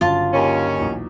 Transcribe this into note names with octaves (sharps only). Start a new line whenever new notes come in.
G1 C#3 F#3 F4 A5
D#2 C#4
B1 E2 A#2